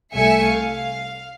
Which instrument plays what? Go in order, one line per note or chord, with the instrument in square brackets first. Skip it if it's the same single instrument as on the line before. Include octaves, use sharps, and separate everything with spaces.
[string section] C2 A3 E5 G#5 C#7
F5